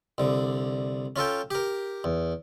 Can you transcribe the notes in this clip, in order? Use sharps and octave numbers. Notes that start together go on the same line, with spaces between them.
C2 D3
C#4 F4 A4 G5
G4 A#4
E2